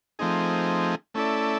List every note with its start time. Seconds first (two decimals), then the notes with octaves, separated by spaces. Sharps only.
0.19 F3 A3 C4 D#4 G#4
1.14 A3 C#4 E4 A4 D5